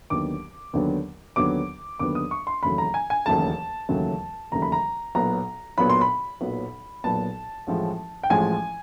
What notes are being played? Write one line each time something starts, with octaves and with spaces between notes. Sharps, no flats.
D#2 D3 F#3 B3 D6
D#2 D3 F#3 B3
D#2 D3 F#3 B3 D6
D#2 D3 F#3 B3 D6
D#6
C#6
C6
E1 D#2 C#3 F#3 A3 B5
A#5
G#5
G#5
E1 D#2 C#3 F#3 A3 A5
E1 D#2 C#3 F#3 A3
E1 D#2 C#3 F#3 A3 A#5
B5
A#5
B1 A#2 F#3 B3 A#5
B1 A#2 F#3 B3 B5
C6
B5
B1 A#2 F#3 B3
B1 A#2 F#3 B3 A5
A1 A2 F3 G#3
G5
A1 A2 F3 G#3 G#5